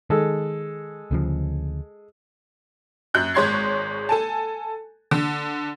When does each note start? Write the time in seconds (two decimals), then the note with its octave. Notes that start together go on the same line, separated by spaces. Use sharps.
0.10 D#3 G#3 A4
1.11 D2 C#3 F3
3.14 F#2 F#6 G6
3.34 G#1 G#3 C#5 C6 G#6 C7
4.09 A4 G#5 A5
5.11 D3